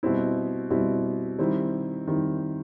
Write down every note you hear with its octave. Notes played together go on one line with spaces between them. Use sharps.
B2 G3 C4 E4
B2 G3 C4 E4
D#3 G3 C4 E4
D#3 G3 C4 E4